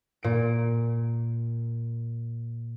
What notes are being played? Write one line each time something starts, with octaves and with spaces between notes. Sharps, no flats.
A#2 D7